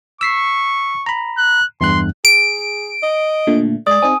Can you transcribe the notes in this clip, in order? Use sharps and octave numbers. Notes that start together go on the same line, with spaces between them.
C#6 E6 B6 C7
A#5 B5
F#6
E2 G2 C6 F#6
G#4 D7
D#5
A#2 D3 A3
G#3 G#4 D5 D#6
C4 D#4 G#4 G#5